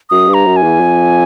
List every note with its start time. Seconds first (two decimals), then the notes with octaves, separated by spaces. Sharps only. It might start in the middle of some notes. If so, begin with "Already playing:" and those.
0.10 F#2 D#6
0.28 G2
0.34 A#5
0.46 F#2
0.56 G#5
0.63 E2
0.80 F2